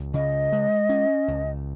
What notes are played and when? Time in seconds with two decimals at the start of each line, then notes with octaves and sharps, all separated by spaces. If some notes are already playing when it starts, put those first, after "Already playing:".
Already playing: C#2
0.14 C#3 D#5
0.52 G#3
0.89 C#4
1.28 C#2